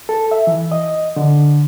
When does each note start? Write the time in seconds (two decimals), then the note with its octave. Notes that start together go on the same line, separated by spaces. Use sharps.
0.09 A4
0.31 E5
0.47 E3
0.72 D#5
1.16 D3